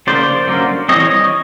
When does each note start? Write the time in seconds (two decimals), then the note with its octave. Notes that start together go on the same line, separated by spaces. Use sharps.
0.07 C#3 F3 A#3 C5 D5
0.47 D3 F#3 A#3 C#4
0.89 E3 G3 C4 C#5 D#5